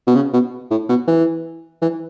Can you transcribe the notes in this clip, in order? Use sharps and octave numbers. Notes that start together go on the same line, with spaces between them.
B2
C#3
B2
A2
B2
E3
E3